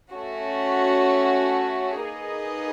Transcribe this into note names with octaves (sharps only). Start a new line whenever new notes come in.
A3 C#4 F#4
A#3 D#4 G#4 B4 D#5